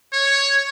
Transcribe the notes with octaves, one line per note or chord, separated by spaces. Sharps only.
C#5